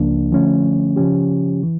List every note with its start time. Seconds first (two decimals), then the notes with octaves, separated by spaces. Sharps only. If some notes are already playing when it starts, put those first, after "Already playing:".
Already playing: C#2 C#3 F3 A#3 D4
0.32 D3 F3 A3 C#4
0.96 C#3 F3 C#4 G4
1.63 E3